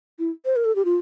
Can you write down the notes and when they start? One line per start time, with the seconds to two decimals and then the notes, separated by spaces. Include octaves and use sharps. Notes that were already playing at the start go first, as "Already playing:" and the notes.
0.19 E4
0.45 C5
0.56 A#4
0.65 A4
0.76 G4
0.85 F4